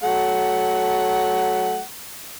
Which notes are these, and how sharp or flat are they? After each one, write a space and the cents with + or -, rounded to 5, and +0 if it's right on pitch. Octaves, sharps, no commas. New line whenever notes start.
F#3 +0 A3 -20 F#5 +10